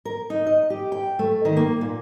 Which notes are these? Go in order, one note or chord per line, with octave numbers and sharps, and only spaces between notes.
A#4
D#4
D#5
G4
G5
A3
D#3
A#3
A#2